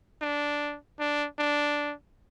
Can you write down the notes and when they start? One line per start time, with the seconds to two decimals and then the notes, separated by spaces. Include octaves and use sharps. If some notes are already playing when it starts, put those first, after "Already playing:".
0.22 D4
0.99 D4
1.39 D4